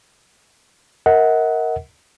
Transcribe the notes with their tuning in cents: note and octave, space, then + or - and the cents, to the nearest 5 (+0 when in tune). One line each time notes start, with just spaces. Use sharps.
A#4 +0 D#5 +45 F#5 +0